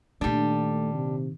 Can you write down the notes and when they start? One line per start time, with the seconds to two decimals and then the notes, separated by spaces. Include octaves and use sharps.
0.21 A#2 D#3 G3 A3 D4
0.94 C3